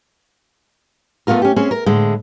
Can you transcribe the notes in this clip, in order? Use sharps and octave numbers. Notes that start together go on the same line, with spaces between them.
A3 B3 C#4 F4 A#4
C#4 G4
C4 C#4 G#4
A#4
A2 D3 G#3